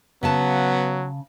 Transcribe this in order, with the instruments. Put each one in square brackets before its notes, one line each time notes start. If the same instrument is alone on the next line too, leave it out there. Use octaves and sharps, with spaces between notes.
[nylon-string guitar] C#3 F5 A5 [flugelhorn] F#3 [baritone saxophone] B3